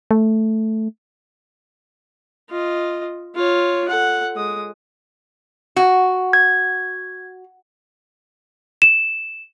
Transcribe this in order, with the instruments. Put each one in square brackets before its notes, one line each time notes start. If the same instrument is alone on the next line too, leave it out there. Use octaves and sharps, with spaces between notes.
[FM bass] A3
[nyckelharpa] F4 D#5
F4 C#5
A4 F#5
G#3 D#6
[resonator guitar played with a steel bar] F#4
[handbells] G#6
[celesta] E7